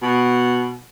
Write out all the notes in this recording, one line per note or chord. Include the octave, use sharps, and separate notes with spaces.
B2